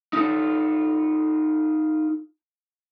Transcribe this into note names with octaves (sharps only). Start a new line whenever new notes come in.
D#4 F4 A4